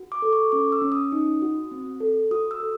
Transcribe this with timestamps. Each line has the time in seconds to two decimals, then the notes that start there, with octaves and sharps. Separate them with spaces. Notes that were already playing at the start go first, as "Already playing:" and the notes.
Already playing: F#4
0.12 D6
0.22 A4
0.33 C#6
0.52 C#4 D6
0.72 E6
0.82 C#4
0.92 D#6
1.12 D#4
1.42 F#4
1.71 C4
2.01 A4
2.31 F#4 D#6
2.51 E6
2.60 A4